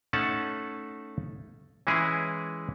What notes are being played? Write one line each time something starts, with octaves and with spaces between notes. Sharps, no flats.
A3 C#4 D#4 F#5 A5
E3 G#3 C#4 E4 G#4